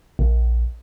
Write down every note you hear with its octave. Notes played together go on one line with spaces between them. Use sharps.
A#1